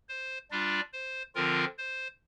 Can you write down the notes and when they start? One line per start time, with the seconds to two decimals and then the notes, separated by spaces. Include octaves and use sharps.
0.09 C5
0.51 G3 D4 F4 D5
0.93 C5
1.35 D3 F3 C4 F4 A#4
1.78 C5